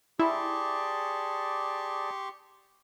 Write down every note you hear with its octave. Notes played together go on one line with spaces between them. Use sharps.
E4 G4 G#4 D5 A5 C6 C#6